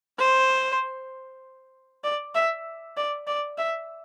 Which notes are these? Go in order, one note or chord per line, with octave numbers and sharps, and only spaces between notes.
C5
D5
E5
D5
D5
E5